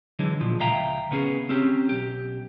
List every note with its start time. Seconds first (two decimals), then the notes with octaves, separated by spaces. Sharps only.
0.19 D3 E3 F#3 G#3
0.41 A#2 F3
0.60 C#2 E5 F5 G5 A#5
1.11 C#3 B3 C#4 G#4
1.49 C4 C#4 G4
1.89 B1 G4